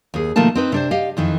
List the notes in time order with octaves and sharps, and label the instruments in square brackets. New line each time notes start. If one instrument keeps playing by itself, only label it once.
[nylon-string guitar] D#2 G#4
B2 D#3 F3 A3 A#3 A5
C4 D#4 B4
C3 D4 C5
G4 D#5 F5
F2 D#3 E3